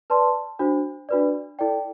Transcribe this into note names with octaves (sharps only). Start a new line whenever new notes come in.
B4 D5 A5 C6
D4 F#4 C5
D4 F#4 B4 D5
E4 A4 D5 G5